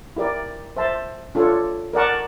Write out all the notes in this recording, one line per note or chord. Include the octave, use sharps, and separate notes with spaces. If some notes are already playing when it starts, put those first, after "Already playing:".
E4 G4 A#4 D5
C5 E5 A5 C6
D4 F4 A4 C#5
A#4 D5 F#5 A5 C#6